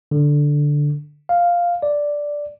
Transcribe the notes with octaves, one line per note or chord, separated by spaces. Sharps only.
D3
F5
D5